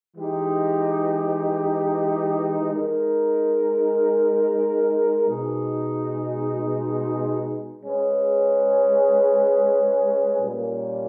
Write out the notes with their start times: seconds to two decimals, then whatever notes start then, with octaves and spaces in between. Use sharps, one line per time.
0.16 E3 G#3 D#4 G4
2.72 G#3 D#4 A#4
5.28 B2 G#3 D#4 G#4
7.83 G#3 C#4 G#4 B4
10.39 A#2 G3 A#3 C#4